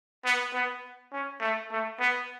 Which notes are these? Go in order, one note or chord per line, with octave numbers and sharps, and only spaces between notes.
B3
B3
C#4
A3
A3
B3